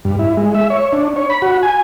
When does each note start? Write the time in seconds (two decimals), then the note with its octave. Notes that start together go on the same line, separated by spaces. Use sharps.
0.05 G2
0.19 E4
0.37 G#3
0.54 E5
0.70 C#5
0.93 D4
1.16 C#5
1.30 B5
1.42 F#4
1.63 G#5